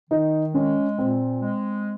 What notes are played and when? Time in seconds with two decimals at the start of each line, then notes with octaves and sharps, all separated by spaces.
0.10 D#3 D#4
0.54 G#3 C#4
0.98 A#2 C4
1.41 G#3